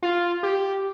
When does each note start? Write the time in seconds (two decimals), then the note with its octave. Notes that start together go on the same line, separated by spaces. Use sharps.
0.02 F4
0.43 G4